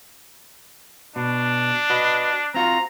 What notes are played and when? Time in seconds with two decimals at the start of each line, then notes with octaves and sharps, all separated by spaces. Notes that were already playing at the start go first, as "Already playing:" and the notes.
1.16 B2 D4
1.90 F#4 B4 D#5
2.54 C4 F4 F#4 A#5